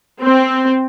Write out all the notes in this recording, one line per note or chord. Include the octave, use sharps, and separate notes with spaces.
C4